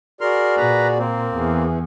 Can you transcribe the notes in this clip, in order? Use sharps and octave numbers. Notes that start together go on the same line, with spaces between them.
F#4 G#4 A#4 D5 C6 F6
A#2 B4 A#5
A#3 C4
E2 E3 G#4